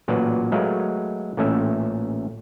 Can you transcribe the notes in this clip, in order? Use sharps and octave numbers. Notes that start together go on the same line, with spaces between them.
A1 A#2 F#3 B4 D5 A5
F#3 G#3 A3 A#4 B4 F5
A1 A#2 A3 C#4 E5